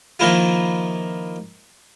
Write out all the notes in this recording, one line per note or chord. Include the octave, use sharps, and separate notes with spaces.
D#3 F3 A#3 E4 F4